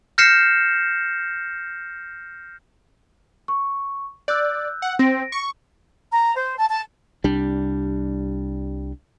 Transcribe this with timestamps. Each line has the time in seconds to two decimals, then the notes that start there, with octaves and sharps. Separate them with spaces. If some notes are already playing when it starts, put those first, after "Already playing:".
0.18 F6 G6 A#6 C7 C#7 E7
3.48 C#6
4.28 D5 E6 F#6 G6
4.82 F#5
4.99 C4 A#6 D7
5.32 C#6
6.12 A#5
6.35 C5
6.57 A5
6.70 A5
7.24 C2 G3 D4